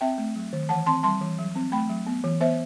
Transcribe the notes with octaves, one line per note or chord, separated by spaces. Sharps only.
C4 E5 G5
A3
F#3
D#3
E3 F#5 A5
C4 A5 C6
G3 A5 C6
E3
F#3
C4
A3 G5 B5
F#3
B3
E3
B3 C5 E5